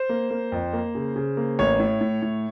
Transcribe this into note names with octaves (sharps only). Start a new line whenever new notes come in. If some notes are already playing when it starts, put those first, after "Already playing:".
Already playing: C5
A#3
A#3
F2
A#3
C#3
C#3
A#3
A1 C#5
A2
A2
A2